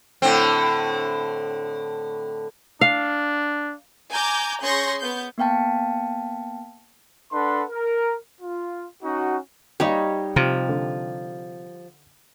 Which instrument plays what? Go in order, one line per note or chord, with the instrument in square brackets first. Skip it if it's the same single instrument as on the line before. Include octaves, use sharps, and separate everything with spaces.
[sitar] A2 D3 C4
[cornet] D4 [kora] F5
[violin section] G#5 A#5 D6 G6
C#4 G#4 C6 C#6 G6 A#6
B3 G6
[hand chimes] A#3 B3 F5 G5 A5
[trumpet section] D4 A4 B4 F#5 C6
A#4
F4
C#4 D#4 F#4
[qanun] G3 D#4 C#5 [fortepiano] G4 D#5 F5
[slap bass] C3 [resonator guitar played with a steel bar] F3
[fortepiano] D3